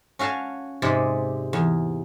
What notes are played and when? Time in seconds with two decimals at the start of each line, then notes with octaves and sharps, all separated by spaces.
0.19 C#4 F#4 F5 G#5 A5
0.82 G#2 C3 G#3 D5
1.53 E2